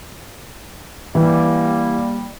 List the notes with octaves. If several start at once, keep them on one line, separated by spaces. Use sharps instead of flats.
E3 G3 A#3